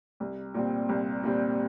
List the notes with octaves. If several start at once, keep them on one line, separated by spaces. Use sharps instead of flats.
C2
A#2 G3 C4
C2
A#2 G3 C4